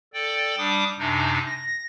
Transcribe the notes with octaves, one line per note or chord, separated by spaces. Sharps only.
A4 D5 G5
G3 D4 D6 D#6
F#2 C3 D4 D#4
A#6